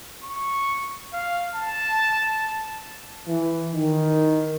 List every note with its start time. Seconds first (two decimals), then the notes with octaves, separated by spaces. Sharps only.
0.24 C#6
1.13 F5
1.55 A5
3.28 E3
3.73 D#3